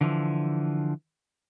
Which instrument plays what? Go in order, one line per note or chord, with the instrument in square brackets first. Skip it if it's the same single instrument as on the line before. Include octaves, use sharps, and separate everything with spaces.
[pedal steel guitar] D3 E3 F3